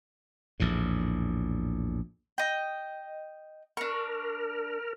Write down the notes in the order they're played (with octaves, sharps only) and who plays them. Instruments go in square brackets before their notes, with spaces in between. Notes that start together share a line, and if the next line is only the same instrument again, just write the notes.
[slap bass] A#1 E2 A2
[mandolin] D#5 G5
[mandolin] D4 C#6 [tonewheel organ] A#4